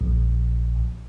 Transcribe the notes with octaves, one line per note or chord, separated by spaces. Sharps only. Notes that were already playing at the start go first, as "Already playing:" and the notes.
A#1